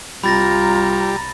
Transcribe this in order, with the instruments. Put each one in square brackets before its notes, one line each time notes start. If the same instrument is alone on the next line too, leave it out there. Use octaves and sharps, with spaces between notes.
[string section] C2 A#5 [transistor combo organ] G3 [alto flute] F4 [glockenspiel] B5 A6 A#6